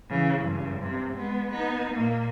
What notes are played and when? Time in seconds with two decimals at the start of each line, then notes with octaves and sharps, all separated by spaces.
0.10 C#3 E3
0.44 G2 C#3
0.78 G2 C3
1.13 G#3 B3
1.51 B3 D#4
1.93 A#2 A#3